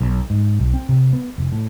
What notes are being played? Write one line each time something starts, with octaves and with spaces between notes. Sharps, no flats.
B1
G#2
B1
C4
C3
B3
F1
A2